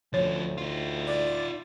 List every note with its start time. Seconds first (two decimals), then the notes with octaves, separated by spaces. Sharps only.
0.14 D2 F3 C#4 C#5
0.58 D#4 F4
1.07 D5